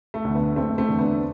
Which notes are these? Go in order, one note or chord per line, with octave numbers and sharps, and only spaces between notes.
A3
D2 D3
B3
F#1 A3 C4
A3 C4
E2 D3
B3 D4